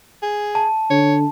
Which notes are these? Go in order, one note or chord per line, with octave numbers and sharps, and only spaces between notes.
G#4
A5
D3 C#5